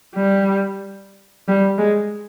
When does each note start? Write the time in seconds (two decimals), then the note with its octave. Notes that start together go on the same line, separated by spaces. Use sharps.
0.15 G3
1.48 G3
1.78 G#3